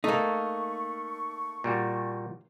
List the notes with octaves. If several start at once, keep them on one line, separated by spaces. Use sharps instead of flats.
A3 A#3 D#4 C#6
A#2 G3 F#4